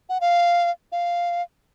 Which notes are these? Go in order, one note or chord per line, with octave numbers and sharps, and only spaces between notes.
F#5
F5
F5